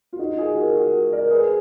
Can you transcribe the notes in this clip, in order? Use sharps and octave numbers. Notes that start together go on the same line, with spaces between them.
F4
D#4 F#4
F4 G#4
F#4 A#4
F#4 A#4
A#4 D5
G#4 B4